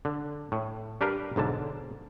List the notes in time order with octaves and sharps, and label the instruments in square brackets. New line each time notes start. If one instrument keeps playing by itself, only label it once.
[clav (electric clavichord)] D3
A2
G3 D4 G4 A#4 B4 F5
B1 G#2 D3 A5